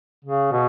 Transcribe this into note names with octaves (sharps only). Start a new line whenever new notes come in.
C#3
B2